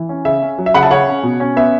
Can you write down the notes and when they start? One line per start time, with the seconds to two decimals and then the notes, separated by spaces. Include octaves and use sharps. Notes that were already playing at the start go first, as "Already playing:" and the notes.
Already playing: E3
0.09 C#4
0.25 C#3 E5
0.42 C#4
0.58 F#3
0.66 E5
0.74 C#3 F#5 B5
0.83 E5 A5
0.91 C#3 C#5 F#5
1.07 C#4
1.23 B2
1.40 C#4
1.56 B3 E5